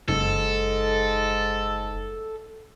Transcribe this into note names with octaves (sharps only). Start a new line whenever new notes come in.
F#1 G#2 A4